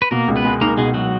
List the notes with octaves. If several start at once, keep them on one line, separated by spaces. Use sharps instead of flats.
B4
B2 A#3 A#4
C#2
B3 B4
G#3
A#3 D#4 A#4
B2 G#3 G#4
F#3 F#4